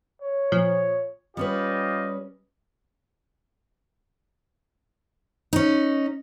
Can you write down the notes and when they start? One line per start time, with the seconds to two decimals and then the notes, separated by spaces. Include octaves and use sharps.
0.22 C#5
0.52 A#2 F3
1.37 G3 C#4 F4 G4 B4 D#5
5.53 C#4 D#4